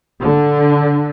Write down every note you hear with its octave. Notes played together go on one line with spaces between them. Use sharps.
D3